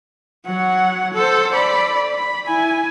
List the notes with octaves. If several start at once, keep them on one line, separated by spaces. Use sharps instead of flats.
F#3 F#5
A4 C5
D5 B5
B5
E4 G#5